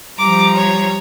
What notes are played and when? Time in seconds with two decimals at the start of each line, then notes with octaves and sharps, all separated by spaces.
0.19 F3 G3 A#5 D6
0.56 C#5